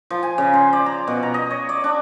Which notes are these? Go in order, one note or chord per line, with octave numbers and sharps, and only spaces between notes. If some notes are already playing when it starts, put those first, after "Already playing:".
F3
G#5
C#3
C5
D5
A#5
B2
A#5
D#5
C#5
D5
D4